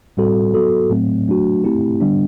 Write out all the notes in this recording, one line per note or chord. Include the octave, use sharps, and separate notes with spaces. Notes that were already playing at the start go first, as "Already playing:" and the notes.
A2 G3 C4 F#4 A4
F#3 B3 F#4 A4
A2 F#3 A3 C4
F#3 A3 D4 F#4
A3 C4 E4 G4
D3 G3 B3 D4